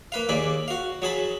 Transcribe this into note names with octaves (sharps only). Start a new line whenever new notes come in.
A#3 B4 F5
D#2 A#3 G#4 D5 B5
F#4 F5
F#3 G#4 A5 B5